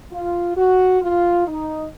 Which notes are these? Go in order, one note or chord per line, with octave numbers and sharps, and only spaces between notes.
F4
F#4
F4
D#4